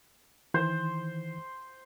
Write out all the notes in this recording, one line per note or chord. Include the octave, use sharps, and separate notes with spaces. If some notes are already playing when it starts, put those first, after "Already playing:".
D#3 E3 C5